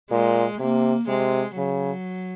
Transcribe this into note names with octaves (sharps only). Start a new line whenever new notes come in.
A#2 G#3
C3 A#3
C3 G#3
C#3 F#3